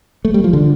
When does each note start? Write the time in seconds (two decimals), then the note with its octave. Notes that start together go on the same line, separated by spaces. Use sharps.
0.25 A3
0.34 G3
0.44 F3
0.53 D3